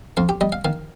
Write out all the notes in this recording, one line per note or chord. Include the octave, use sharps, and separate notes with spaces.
F2 F5
G4
G3 D#5
F5
D#3 F5